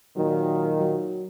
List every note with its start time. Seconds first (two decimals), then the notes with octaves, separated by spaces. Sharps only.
0.16 A#2 D#3 F#3
0.80 F#3